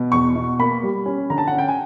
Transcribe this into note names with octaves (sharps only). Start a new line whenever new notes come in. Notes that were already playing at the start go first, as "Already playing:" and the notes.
Already playing: B2
E2 C#6
B2
A#3 B5
G3
C#4
D3 A#5
A5
C#4 F#5
G5
G#5